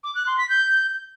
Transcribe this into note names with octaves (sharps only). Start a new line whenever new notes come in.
D6
F#6
C6
B6
G6